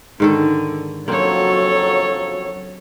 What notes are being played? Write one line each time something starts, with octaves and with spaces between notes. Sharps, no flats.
G#2 D3 D#3 A4
F2 C#3 F#3 A#3 C4 D4 A4 C#5